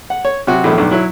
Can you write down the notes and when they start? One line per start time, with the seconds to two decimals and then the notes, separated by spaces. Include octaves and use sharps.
0.10 F#5
0.25 C#5
0.47 C3 F#3 F#4
0.64 A#1 E2 A2
0.78 B1 G2
0.91 F#3 E4